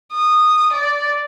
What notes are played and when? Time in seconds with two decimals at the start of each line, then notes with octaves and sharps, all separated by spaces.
0.12 D#6
0.73 D5